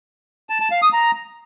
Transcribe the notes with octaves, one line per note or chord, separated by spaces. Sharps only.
A5
A5
F5
D#6
A#5